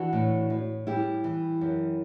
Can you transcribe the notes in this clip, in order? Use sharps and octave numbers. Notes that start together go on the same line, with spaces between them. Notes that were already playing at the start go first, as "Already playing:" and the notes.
Already playing: E3 D4 F#4
A2
A2
G3 E4 G4
E3
F#2